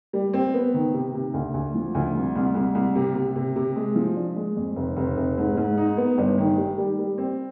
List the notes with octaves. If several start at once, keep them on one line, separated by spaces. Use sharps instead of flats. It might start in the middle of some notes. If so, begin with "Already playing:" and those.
G3
C4
B3
D#3
C3
C3
D2
D2
F3
D2
C2
C2
C2
C2
C3
C3
C3
C3
G#3
F3
D4
G#3
F2
F1
F1
F1
G#2
G#2
D#4
B3
G1
D#3
G3
G3
G3
C4